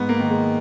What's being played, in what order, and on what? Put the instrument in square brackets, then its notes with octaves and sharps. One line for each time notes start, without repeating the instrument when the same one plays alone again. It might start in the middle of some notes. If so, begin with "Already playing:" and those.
Already playing: [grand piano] G#2 B3
A#3
D#3
G#3